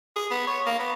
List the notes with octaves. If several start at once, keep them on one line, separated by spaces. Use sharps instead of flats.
G#4
B3
C#5
A#3
B3